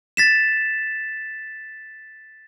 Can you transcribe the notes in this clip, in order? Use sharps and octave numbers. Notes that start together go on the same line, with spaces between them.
A6 B6 E7